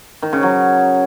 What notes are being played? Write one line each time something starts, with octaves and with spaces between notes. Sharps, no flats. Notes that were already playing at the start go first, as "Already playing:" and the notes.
D#3
C#3
F#3